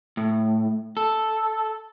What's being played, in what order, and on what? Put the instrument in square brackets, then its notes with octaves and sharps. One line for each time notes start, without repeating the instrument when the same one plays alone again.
[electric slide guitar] A2
A4